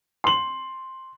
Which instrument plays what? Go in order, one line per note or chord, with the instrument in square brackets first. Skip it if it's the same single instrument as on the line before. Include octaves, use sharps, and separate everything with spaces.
[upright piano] C6 F#7